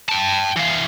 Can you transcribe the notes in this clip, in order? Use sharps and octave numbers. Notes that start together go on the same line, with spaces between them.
G5 A5
E3 F5